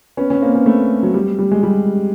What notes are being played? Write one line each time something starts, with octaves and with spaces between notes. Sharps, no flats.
B3 C#4
B3 C#4
A#3 C4
B3 C#4
A3 B3
F#3
G3
G3
G#3
G3